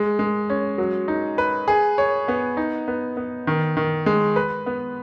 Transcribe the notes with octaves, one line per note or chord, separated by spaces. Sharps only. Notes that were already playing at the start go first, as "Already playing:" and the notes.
Already playing: G#3
G#3
C#4
F#3
D#4
B4
G#4
C#5
B3
D#4
B3
B3
D#3
D#3
G#3
B4
B3